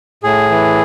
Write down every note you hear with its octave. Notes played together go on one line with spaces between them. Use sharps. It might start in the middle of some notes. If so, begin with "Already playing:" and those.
A2 G#4
E3